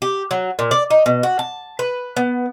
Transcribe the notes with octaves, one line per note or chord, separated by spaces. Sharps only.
G4
F#3
A#2
D5
D#4
B2
F#4
A5
B4
B3